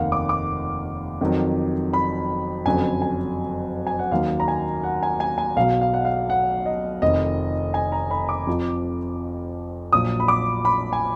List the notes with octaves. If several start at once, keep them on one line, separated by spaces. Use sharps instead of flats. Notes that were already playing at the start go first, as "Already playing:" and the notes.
Already playing: F1 D#2 D#3 F5 F#5
D6
D6
F2 D#3 F#3
B5
F#1 F2 D3 F#3 G#5
G#5
G#5
F#5
D#2 D#3 F#3 F5
A#5
G#5
F#5
G#5
G#5
G#5
B1 B2 F#3 F5
F5
F#5
F5
F#5
D#5
F1 F2 D#3 D#5
G#5
A#5
B5
D6
F2 F3
A#1 A#2 F#3 D#6
B5
D6
B5
G#5